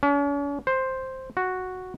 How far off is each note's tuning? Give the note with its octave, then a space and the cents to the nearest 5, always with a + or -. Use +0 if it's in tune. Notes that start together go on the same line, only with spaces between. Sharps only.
C#4 +45
C5 +5
F#4 -5